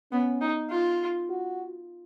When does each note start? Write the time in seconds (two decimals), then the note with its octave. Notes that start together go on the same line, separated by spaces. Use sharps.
0.12 B3 C#4
0.41 D#4
0.70 F4
1.29 F#4